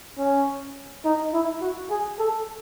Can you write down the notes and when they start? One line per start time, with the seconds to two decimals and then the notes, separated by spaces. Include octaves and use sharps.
0.19 C#4
1.05 D#4
1.34 E4
1.62 F#4
1.91 G#4
2.19 A4